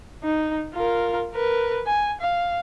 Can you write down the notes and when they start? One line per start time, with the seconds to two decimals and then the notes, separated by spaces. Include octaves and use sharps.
0.23 D#4
0.74 F4 A#4
1.33 A#4 B4
1.86 G#5
2.21 F5